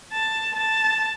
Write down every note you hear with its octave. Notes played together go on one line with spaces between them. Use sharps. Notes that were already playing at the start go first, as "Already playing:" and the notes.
A5
A5